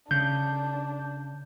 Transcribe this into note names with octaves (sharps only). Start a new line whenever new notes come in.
C#3 D4 G6